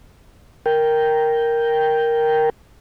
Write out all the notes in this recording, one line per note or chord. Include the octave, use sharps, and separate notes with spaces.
A#4 G5